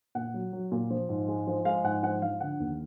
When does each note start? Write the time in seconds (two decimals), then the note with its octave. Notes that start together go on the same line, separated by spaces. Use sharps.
0.15 A#2 F#5
0.34 F#3
0.53 F#3
0.72 A#2
0.90 F3
1.09 G#2
1.28 G#3
1.47 F3
1.65 G#3 F5
1.84 G#2 F#5
2.03 F3 F#5
2.22 F3 F5
2.40 D3 F#5
2.60 D#2